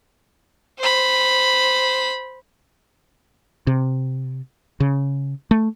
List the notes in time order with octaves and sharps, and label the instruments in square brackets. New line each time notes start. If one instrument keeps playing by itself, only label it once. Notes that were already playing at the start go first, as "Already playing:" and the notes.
[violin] C5 B5
[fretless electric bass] C3
C#3
A3